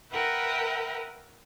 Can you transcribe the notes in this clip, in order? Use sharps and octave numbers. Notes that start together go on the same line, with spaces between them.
A#4 B4 E5 F#5 G5